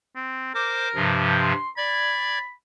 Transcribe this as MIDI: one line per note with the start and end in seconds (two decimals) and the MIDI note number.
0.16 0.53 60
0.55 1.09 70
0.55 0.88 72
0.55 0.88 86
0.95 1.52 43
0.95 1.52 48
0.95 1.52 53
1.41 1.69 84
1.77 2.38 74
1.77 2.52 83
1.77 2.38 92